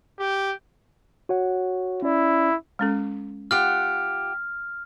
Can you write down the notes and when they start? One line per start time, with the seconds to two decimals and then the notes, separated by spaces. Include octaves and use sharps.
0.19 G4
1.29 F#4 C#5 F#5
2.02 C#4 E4 D5
2.79 G#3 C#4 A4
3.51 F4 G4 F#5 F6